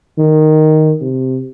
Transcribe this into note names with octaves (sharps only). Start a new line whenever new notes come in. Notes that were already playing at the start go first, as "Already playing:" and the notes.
D#3
C3